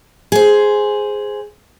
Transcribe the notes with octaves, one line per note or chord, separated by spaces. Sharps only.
G#4 C5